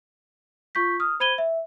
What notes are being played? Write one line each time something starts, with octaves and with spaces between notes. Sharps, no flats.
F4 C#6 G6 B6
D#6 F6
C5 B5 G#6 D#7 G7
E5